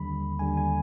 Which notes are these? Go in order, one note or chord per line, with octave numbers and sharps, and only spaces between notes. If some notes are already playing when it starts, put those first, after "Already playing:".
Already playing: D#2 D3 G3 B5
D#2 D3 G3 G#5
G#5